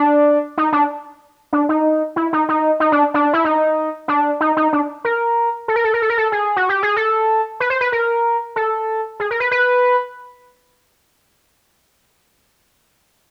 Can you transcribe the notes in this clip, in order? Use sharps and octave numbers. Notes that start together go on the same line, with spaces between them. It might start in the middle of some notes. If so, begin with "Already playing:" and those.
Already playing: D4
D#4
D4
D4
D#4
E4
D#4
D#4
D#4
D4
D4
E4
D#4
D4
D#4
D#4
D4
A#4
A4
A#4
A4
A#4
A4
A#4
A4
G#4
F#4
G4
G#4
A4
B4
C5
B4
A#4
A4
G#4
A#4
B4
B4